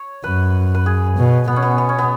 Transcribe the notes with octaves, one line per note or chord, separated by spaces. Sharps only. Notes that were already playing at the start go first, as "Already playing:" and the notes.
Already playing: C#5
F#2 B4
B4
G#4
B2
B2 B3
C#4
B3
B3
C#4
B3